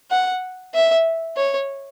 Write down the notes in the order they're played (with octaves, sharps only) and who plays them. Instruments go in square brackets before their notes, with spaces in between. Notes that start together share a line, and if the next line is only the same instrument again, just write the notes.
[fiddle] F#5
E5
C#5